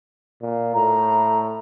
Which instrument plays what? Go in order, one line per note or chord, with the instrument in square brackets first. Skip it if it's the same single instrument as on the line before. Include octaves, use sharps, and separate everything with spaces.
[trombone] A#2
[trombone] A2 [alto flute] A#5